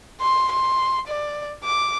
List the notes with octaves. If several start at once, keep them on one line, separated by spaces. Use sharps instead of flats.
C6
C6
D5
D6